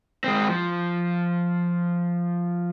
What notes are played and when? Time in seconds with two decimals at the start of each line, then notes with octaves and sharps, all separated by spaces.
0.24 G#3 C4
0.48 F3